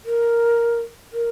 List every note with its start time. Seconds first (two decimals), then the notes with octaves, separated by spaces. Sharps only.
0.06 A#4
1.13 A#4